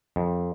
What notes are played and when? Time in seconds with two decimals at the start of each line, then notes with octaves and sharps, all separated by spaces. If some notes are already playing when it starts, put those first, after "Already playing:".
0.16 F2